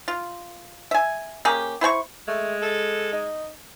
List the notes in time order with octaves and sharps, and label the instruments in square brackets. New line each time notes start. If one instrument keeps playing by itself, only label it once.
[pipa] F4
E5 G#5
A#3 C#4 G4 G#4
E4 C5 G5 C#6
[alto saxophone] G#3 [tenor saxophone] A3
[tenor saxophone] A4
D#4